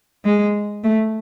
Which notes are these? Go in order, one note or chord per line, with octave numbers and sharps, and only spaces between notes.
G#3
A3